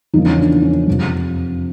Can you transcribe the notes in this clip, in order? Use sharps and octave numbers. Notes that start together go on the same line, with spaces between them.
E2 C#3 F3 A#3 D#4
C#4
D4
C#4
F2 C3 F3